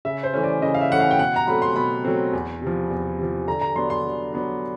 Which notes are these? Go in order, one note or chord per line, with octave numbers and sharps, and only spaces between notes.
C#3 E5
C5
E3 A3 C#4
D5
C#3 D#5
F5
E5
E3 A3 C#4 F#5
F5
G5
B2 F#5
A#5
F#3 A3 C4 B5
C6
B2 B5
F#3 A3 C4
E2
C3 F3
E2
C3 F3
D3 A#5
A#5
F#3 B3 D4 C6
C6
D3
F#3 B3 D4